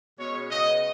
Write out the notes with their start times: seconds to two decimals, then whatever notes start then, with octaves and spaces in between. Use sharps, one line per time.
0.18 B2 G#3 C#4 C#5
0.50 C#3 G#3 B3 D#5